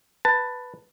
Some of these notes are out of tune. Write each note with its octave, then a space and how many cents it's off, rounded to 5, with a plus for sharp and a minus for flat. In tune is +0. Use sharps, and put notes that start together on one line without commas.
B4 +0 A5 +15